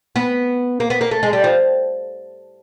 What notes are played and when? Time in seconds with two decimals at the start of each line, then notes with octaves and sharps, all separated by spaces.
0.16 B3
0.80 A#3
0.90 B3
1.01 A#3
1.11 A3
1.23 G#3
1.33 G3
1.44 F3